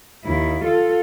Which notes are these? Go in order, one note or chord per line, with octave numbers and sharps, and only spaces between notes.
D#2 E4
F4 A4